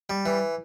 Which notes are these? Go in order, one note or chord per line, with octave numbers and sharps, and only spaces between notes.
G3
E3